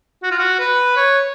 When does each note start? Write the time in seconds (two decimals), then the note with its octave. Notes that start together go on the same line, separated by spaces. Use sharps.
0.23 F#4
0.31 F4
0.39 F#4
0.59 B4
0.97 C#5